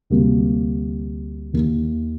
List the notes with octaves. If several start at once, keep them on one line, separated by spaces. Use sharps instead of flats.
D2 C3 G3 A#3
D#2 D#3 A#3